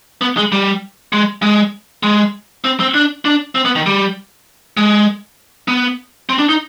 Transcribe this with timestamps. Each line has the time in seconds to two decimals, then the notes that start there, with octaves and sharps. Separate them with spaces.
0.21 B3
0.37 G#3
0.52 G3
1.13 G#3
1.42 G#3
2.03 G#3
2.64 C4
2.80 C4
2.94 D4
3.25 D4
3.55 C4
3.65 B3
3.76 D#3
3.86 G3
4.77 G#3
5.68 B3
6.29 C4
6.39 D4
6.49 D#4